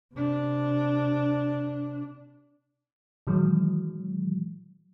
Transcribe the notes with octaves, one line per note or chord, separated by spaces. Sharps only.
C3 D4
A#2 D#3 E3 F#3 G#3